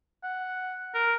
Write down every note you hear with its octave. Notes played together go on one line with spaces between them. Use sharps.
F#5
A#4